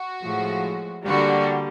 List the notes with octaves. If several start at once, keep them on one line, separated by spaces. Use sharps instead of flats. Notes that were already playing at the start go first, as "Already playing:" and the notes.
Already playing: F#4
A2 F3 G#3
D3 G3 A#3 F#4